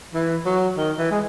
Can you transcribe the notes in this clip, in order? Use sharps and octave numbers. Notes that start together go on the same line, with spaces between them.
E3
F#3
D#3
E3
G#3